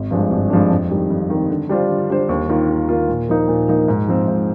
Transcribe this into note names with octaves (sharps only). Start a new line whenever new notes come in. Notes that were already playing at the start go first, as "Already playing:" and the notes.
Already playing: G#1
G2 F3 G#3 D4
G#1
G2 F3 G#3 D4
F2
D#3 G3
F2
D#3 G3
D3
G3 D4 F4 C5
D3
G3 D4 F4 C5
D#2
D#3 A#3 F4
D#2
D#3 A#3 F4
A#2
F3 A#3 D#4
A#2
F3 A#3 D#4
G#2
F3 C4
G#2